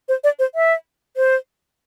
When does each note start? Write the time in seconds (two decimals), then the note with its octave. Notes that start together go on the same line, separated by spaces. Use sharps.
0.08 C5
0.24 D5
0.39 C5
0.55 E5
1.17 C5